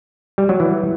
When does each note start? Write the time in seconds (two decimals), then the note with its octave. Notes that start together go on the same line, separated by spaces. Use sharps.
0.38 G3
0.49 F#3
0.60 E3